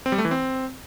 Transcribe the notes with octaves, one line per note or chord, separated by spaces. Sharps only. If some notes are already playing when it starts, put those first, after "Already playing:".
C4
G3
A3
E3
C4